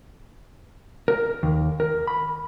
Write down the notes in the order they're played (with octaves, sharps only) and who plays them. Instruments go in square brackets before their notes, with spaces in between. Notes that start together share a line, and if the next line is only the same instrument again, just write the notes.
[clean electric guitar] A#4
D#2
A#4
B5